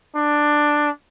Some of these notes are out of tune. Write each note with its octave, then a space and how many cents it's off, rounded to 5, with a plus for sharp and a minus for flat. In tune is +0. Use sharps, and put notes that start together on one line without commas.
D4 +10